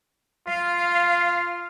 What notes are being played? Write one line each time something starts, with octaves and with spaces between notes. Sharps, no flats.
F4 F5